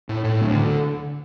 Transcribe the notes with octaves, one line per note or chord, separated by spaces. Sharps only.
A2
A2
D2
D3